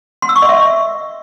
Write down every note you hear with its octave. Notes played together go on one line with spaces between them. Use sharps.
C6
E6
C#6
D#5
E5